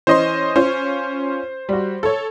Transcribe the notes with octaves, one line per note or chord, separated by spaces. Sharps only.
E3 C#4 C5 D#5 C6
C#4 F4 C5
G3 F#4
A4 C#5